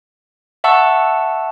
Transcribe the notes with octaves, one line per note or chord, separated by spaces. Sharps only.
E5 F#5 A5 C#6 E6